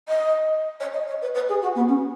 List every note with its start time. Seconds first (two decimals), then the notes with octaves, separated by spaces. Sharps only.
0.08 D#5
0.80 C#5
0.93 D#5
1.07 C#5
1.22 B4
1.34 B4
1.49 G#4
1.62 F#4
1.75 B3
1.88 C#4